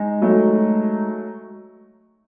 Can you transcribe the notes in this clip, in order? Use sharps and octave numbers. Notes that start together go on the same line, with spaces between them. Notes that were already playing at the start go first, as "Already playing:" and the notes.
Already playing: G#3 D#4
F#3 A3